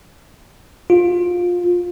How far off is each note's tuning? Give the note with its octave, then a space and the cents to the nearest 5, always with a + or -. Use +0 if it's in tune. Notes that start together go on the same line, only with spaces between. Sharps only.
F4 +20